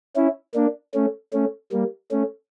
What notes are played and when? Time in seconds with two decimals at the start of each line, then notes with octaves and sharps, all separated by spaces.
0.16 C#4 E4
0.55 A#3 D4
0.94 A3 C#4
1.33 A3 C#4
1.72 G3 A#3
2.11 A3 C#4